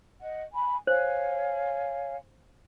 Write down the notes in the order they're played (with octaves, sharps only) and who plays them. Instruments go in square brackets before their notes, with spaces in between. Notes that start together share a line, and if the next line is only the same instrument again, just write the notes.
[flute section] D#5 F#5
G#5 B5
[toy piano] C5 [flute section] C#5 F5 G#5